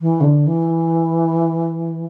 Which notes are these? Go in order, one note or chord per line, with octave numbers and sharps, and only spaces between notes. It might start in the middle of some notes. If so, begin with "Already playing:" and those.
E3
C#3
D3
E3